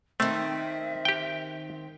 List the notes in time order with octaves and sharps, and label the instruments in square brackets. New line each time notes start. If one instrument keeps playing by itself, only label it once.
[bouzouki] D#3 C4 [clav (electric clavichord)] A3 [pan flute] E5
[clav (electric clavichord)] G4 G5